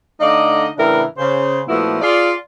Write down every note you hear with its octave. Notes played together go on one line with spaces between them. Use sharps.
D3 A3 D#4 D5 D#5 F5
A2 C#3 E3 D4 E4 A#4
C#3 C5
A#2 F3 A3 B3 E4 F#4
F4 G#4 D5